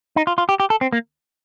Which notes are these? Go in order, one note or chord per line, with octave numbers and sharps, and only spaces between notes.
D#4
F4
F4
G4
G4
A4
C4
A#3